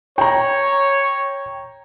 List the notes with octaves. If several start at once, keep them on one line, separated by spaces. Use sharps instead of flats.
C#5 G5 A#5